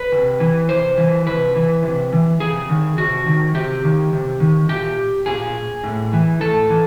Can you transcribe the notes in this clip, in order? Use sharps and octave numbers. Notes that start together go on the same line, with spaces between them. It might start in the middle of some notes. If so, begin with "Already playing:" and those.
Already playing: B4
C3
E3
C3 C5
E3
C3 B4
E3
C3
E3
C3 G#4
D#3
C3 F#4
D#3
C3 G4
D#3
C3
D#3
A#2 G4
A#2 G#4
A2
E3
A2 A4
E3